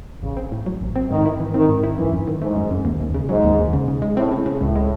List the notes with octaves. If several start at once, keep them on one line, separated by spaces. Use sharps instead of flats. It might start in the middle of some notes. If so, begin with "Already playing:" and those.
A1 C#3
C4
A2
F#3
A1
C4
G#2 D#3
E4
E3
D#3 C4
G#2
E4
F#2 E3
F#2
D#3
G#2 A3
F#2
F#2
D#2
D#2
C#3
G#2 F#3
D#2
D#2
C#3
C#3
G#3
A2 C4
C#3
C#3
C#2 A2
G#3